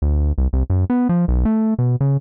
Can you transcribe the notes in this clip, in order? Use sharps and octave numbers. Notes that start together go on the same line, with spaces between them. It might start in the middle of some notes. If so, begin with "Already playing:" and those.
D2
C2
C2
F#2
B3
F3
B1
A3
B2
C#3